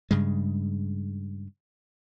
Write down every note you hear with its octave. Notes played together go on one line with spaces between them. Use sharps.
G2 C#3 G#3